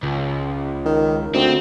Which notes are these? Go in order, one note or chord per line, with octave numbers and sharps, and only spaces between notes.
C#2
D#3
D2 C4